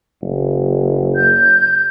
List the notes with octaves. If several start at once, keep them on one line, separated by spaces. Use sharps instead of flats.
F#1
G6